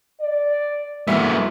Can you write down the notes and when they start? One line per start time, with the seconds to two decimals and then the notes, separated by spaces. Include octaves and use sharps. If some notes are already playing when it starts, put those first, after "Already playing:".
0.21 D5
1.08 E3 G#3 A#3 B3 F#4 E5